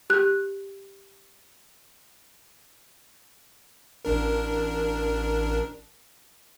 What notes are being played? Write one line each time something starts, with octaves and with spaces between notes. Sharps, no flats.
G4 F#6
A1 D4 A#4